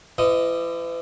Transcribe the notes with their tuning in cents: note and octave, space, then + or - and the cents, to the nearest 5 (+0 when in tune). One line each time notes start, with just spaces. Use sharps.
E3 +40 D#5 +0